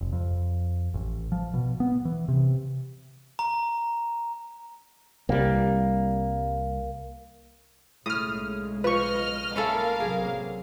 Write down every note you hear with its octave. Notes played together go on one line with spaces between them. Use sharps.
F1
F2
A1
F3
B2
B3
E3
C3
A#5
C2 G3 A#3
B1 A2 C#3 G#3 D#6 F6
F3 B4 D#5 C#6 F6
A#3 C#4 E4 A4 A#4 F5
A1 C3 F#3 G#4